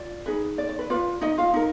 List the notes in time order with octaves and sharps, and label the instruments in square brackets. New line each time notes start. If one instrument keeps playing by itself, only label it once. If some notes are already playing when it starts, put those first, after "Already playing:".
Already playing: [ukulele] F4 D5
D#4 G#4 B4
D5
D5
B4
F4 B4 D5
D#4 D#5
F4 F5
D#4 A#4